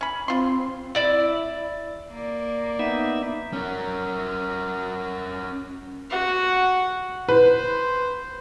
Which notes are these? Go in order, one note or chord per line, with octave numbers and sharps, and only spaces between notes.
C#4 B5
C4 F4 C6
E4 D5 E5
A#3 D5
B3 D#4 E5
C#4 A#4
F#4 F#5
B4 C5